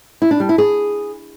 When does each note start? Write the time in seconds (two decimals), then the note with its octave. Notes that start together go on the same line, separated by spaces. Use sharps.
0.22 E4
0.31 D4
0.40 G3
0.49 E4
0.58 G#4